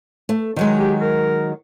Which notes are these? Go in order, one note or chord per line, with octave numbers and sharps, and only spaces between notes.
A3
D#3 F#3 G#3
G4
A#4